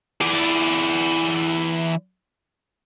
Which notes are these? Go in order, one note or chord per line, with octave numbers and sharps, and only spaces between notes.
E3 D5